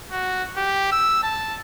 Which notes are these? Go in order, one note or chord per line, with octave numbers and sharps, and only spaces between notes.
F#4
G4
E6
A5